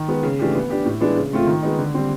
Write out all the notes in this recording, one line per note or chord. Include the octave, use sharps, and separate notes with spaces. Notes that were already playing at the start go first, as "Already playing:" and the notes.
Already playing: D#3
G#3 B3
C#3
E3 A3 D4 G4
B3
D4 G4
A2
E3 G#3 B3 D4
C#3
F3 A3 C4 F4
D#3
G#3 B3 D#4
D3
G3 C4